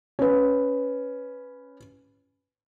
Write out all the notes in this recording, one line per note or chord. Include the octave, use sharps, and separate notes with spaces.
C#4 B4